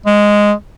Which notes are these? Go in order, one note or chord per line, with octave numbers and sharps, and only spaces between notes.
G#3